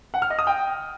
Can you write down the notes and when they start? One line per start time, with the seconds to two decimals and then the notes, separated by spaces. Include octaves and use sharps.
0.14 F#5
0.22 F6
0.30 D#5
0.39 D#6
0.47 G5